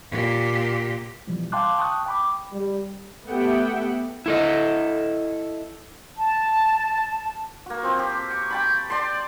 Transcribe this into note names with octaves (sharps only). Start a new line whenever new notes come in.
A#2 G4
B2 E3 F3 G3
F5 G5 A5 C6 D6 F#6
G5 A5 C#6 D#6 F#6
G5 B5 D6
G3
A3 B3 G4 E5 F#5 G5
E4 A4 D#5
A5
A#3 F#4
F3 C4
G4
C#6
G5 A5 B5
D5 A5 C6